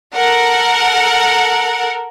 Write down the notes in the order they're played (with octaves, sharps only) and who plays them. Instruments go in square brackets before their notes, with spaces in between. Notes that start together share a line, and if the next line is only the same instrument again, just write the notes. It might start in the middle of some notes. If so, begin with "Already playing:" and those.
[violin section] A4 A#4 F#5